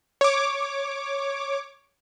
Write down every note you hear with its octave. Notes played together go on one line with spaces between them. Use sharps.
C#5 D6